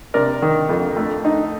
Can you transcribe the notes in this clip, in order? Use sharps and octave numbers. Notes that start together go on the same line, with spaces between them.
C3 A#4 D5
D#3
F2
A3
D#4